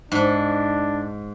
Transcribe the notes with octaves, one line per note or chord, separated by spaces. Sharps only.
G#2 D4